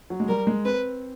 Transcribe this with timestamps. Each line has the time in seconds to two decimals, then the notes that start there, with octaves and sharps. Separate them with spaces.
0.10 F#3
0.20 G#3
0.28 G3 A#4
0.47 G#3
0.65 C4 B4